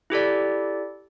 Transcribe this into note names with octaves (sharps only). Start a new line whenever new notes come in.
E4 G4 A4 D5